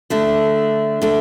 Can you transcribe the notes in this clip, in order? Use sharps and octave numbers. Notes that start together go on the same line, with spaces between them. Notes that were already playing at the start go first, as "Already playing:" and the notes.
D3 A3 D4
D3 A3 D4